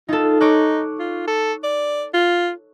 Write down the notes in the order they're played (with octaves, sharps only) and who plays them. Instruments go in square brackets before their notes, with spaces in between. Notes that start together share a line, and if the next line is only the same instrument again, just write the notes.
[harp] D#4 A4 [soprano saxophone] F4
[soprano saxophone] D#4 [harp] C#5 D6 F#6
[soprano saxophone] F4
A4
D5
F4